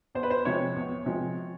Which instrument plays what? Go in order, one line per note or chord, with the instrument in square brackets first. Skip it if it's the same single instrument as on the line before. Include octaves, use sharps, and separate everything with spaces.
[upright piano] E2 C5
B4
C5
C3 F3 G#3 C#5
E2
C3 F3 G#3